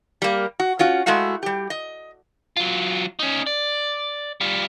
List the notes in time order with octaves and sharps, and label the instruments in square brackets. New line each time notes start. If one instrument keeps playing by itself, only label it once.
[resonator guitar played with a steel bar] G3 A#3
F#4
C#4 F4 F#4
G#3 A3 E4 F#4 F5
G3 G4
D#5
[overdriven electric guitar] F#3 F4
C#4 D#4
D5
G3 F4